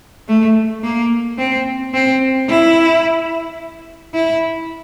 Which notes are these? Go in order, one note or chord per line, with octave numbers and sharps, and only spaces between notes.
A3
A#3
C4
C4
E4
E4